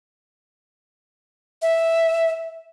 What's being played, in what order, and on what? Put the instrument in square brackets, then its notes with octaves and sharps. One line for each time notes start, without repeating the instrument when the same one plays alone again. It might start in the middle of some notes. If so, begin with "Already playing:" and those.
[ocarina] E5